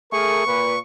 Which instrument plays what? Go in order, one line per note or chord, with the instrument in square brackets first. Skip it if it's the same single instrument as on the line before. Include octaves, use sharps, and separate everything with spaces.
[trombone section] A3 G#4 A#4 [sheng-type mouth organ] C#6
[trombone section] A#2 B4